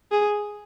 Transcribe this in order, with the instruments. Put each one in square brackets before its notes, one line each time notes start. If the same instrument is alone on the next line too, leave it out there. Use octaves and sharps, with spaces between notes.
[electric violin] G#4